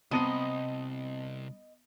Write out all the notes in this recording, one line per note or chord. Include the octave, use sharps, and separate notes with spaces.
C2 B3 C4 D#5 A5 A#5 C6 D#7